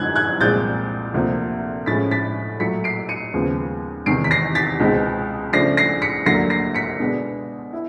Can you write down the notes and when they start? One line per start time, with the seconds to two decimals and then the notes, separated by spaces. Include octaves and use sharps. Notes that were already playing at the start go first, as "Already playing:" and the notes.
Already playing: F#2 D3 F3 G#3 F#6 G#6
0.16 F#6 G#6
0.41 C2 A#2 F3 G#3 C4 G6 A6
1.14 D2 C3 F3 A#3
1.86 A2 F3 G#3 C#4 A6 B6
2.11 A6 B6
2.60 A#2 F#3 A3 B6 C#7
2.84 C7 D7
3.09 C#7 D#7
3.34 D#2 C#3 F3 G#3 B3
4.06 E2 C3 D#3 C7 D7
4.24 B6
4.31 A#6 C7
4.55 A6 B6
4.80 C#2 B2 G#3 C4 D#4
5.53 C#3 F3 A3 D4 A#6 C7
5.77 A#6 C7
6.02 B6 C#7
6.26 D2 D3 F#3 A#3 A#6 C7
6.50 A#6 C7
6.75 B6 C#7
7.00 B2 G#3 B3 D4
7.73 E4